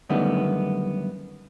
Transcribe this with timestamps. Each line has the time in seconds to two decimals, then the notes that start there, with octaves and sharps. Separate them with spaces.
0.09 F#2 D3 D#3 G3 A3 B3